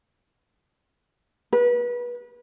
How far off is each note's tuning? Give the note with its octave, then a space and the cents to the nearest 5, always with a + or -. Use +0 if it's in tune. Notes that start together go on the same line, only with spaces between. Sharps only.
B4 -30